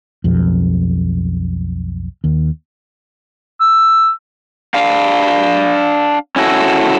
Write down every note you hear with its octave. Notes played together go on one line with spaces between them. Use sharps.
B1 F2
D#2
E6
D4 F5
C#4 E4 F#4 A4